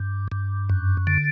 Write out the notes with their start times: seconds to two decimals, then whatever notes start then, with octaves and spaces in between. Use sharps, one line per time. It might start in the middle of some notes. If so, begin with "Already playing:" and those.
Already playing: G2
0.32 G2
0.70 F#2
1.07 D3